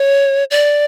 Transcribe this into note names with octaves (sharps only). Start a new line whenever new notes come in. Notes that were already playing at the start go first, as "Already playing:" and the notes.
Already playing: C#5
D5